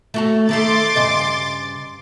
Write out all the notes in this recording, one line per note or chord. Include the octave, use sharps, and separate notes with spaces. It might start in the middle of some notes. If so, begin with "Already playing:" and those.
A3 F#4 A4
D#3 A3 A4 C6 D6 A6
G2 C#3 D#5